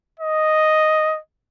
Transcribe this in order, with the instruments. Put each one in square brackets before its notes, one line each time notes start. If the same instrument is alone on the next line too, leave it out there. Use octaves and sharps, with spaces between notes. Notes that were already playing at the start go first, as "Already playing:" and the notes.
[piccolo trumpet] D#5